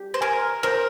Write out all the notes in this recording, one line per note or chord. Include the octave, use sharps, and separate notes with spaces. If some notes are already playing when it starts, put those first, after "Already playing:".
Already playing: G4
C5
A#4 G#5
A#4 C5